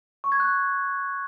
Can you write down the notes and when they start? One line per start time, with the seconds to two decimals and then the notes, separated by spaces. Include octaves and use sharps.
0.24 C#6
0.32 G#6
0.40 F#6